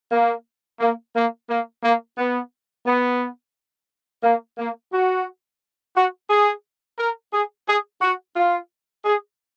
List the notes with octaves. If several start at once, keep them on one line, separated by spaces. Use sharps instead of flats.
A#3
A#3
A#3
A#3
A#3
B3
B3
A#3
A#3
F#4
F#4
G#4
A#4
G#4
G#4
F#4
F4
G#4